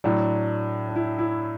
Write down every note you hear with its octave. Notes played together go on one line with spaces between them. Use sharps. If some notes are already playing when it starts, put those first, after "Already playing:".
A2 F#3 D4
D4
E4
E4